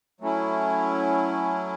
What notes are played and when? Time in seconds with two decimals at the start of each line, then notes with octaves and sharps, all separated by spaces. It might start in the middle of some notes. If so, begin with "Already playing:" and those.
0.20 F#3 A3 C#4 E4